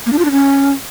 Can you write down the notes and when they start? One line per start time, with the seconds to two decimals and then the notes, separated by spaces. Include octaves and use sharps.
0.06 A#3
0.12 D4
0.19 F4
0.25 D4
0.31 C#4